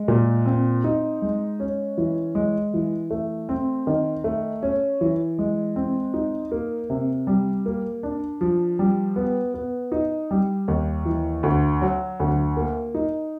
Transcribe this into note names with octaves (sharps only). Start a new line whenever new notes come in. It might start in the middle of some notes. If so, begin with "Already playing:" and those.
Already playing: G#3
A#2
C4
D#4
G#3
C#4
E3
G#3
E3
A3
C4
D#3
A3
C#4
E3
G#3
C4
D#4
A#3
C3
G3
A#3
D4
F3
G3
B3
B3
D#4
G3
D#2
E3
D2
F#3
D2
A#3
D#4